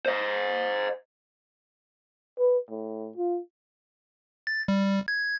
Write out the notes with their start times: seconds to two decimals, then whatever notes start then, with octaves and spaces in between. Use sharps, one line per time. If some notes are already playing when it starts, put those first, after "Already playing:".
0.06 C5 D#5
2.39 B4
2.70 A2
3.17 F4
4.47 A6
4.68 G3
5.08 G#6